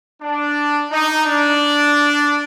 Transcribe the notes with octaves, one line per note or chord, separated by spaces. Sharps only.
D4
D#4
D4